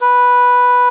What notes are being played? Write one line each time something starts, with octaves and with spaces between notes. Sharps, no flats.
B4